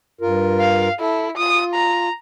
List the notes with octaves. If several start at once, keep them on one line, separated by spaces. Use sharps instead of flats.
G2 F4 A#4
F5
E4 A4
F4 D#6
A#5